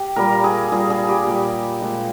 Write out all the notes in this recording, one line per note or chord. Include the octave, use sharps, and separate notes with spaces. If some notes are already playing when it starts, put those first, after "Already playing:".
Already playing: G4
A#2 G3 A#4
G#4
A#2 G3 G#4
G#4
G4
A#2 G3
A#2 F3 G#3